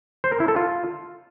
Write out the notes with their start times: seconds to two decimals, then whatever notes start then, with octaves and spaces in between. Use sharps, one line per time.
0.24 C5
0.32 A#4
0.40 E4
0.48 A4
0.56 F4